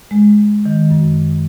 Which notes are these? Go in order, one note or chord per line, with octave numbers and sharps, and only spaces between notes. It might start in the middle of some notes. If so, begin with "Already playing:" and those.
G#3
D#3
F#2